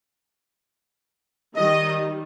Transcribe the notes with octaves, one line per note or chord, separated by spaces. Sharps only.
D#3 G3 D#5